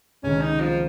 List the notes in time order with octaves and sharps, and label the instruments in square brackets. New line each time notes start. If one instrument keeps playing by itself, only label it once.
[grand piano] C#2 C3 D#3 [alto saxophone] C#4
[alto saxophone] D#4
F3